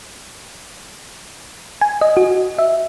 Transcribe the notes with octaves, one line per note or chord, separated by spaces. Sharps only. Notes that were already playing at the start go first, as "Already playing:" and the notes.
G#5
D#5
F#4
E5